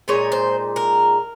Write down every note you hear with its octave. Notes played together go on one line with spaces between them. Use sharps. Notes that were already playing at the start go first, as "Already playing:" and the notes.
A#2 G#3 D#4 C#5
C5
A#4